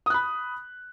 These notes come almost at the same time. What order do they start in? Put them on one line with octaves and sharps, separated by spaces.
D#6 F#6 B5